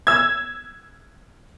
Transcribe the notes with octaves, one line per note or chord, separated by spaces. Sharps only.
E6 G#6